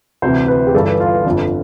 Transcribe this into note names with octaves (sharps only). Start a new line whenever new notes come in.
D2 C3 E3 C5
B4
G4
G1 G2 E3 A4
F4
G1 F2 D3